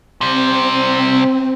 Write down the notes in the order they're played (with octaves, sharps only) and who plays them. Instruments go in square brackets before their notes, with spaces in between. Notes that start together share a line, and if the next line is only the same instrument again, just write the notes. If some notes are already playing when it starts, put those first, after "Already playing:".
[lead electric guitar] C3 G3 [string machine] C4